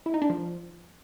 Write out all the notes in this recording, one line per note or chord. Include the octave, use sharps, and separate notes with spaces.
E4
D#4
D4
F3